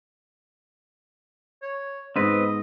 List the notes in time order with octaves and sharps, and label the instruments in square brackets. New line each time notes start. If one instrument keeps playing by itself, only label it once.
[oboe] C#5
[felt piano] G#2 B3 [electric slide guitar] C4 B4 [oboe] D#5